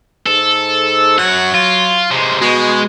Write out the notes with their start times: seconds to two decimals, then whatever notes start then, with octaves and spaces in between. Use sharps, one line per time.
0.27 G#2 A4
1.18 F#2 F#3 F#5
1.54 F4
2.11 C3 G#3
2.41 B2 G#3